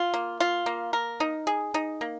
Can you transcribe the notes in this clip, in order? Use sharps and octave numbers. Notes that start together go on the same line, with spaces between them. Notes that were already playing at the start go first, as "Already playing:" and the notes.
Already playing: F4
A#3
F4
A#3
A#4
D#4
G#4
D#4
A#3